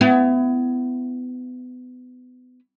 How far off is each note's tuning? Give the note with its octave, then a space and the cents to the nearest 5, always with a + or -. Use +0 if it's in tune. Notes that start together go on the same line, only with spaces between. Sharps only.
B3 +30 E4 +25